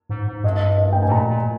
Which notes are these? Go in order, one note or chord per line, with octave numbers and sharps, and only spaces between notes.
G#2
G#2
G2 D#5
D#5
G5
G#2 G#5
A#2 A#5
A#2